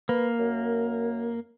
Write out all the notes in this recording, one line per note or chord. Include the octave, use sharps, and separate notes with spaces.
A#3 B4
F#2